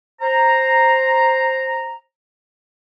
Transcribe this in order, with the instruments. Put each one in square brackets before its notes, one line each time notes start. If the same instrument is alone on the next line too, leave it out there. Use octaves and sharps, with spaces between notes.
[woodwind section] C5 A#5